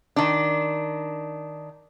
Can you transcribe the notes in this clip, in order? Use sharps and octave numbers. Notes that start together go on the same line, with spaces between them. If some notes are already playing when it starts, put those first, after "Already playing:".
D#3 D4